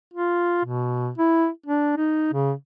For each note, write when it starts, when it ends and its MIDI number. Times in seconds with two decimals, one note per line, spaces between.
0.14 0.63 65
0.65 1.10 47
1.18 1.49 64
1.66 1.93 62
1.97 2.29 63
2.33 2.53 49